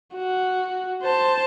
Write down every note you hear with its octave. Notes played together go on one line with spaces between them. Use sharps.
F#4
C5 A5